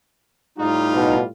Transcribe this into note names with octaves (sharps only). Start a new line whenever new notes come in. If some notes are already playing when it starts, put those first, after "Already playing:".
A2 G3 D#4 F4
B2